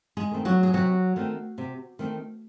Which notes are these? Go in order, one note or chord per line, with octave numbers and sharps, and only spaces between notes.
G#3 G#4
D#3 A3 C4
F#3 F#4
G#4
C3 F#3 F#4
D#3 A3 C4
C3
D#3 A3 C4